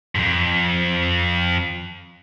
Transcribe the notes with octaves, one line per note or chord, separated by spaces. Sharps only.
F2 G#2